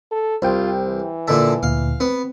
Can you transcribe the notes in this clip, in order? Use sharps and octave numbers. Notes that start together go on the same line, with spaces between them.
A4
C2 F4 C5 G5
E3
A#2 D3 E5 A5
D2 A#2 F5
B3 C4